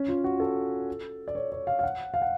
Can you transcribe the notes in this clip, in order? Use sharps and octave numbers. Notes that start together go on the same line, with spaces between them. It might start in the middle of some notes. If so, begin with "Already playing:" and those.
Already playing: C#4
F4
F#4
A4
D5
C#5
C#5
F5
F5
F#5
F5
F#5